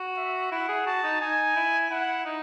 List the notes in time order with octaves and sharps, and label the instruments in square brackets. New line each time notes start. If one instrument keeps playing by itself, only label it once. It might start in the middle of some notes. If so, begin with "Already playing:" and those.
Already playing: [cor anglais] F#4
[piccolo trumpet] E5
[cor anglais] E4 [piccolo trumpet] F#5
[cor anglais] G#4
[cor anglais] F#4 [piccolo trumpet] A5
[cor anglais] D#4
[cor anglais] D#4 [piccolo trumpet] G#5
[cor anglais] E4
[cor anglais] E4 [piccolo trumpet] F#5
[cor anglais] D#4